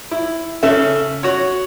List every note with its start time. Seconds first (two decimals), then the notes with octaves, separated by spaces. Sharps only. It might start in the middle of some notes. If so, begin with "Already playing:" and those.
0.11 E4
0.63 C#3 A4 E5
1.23 F#4 C#5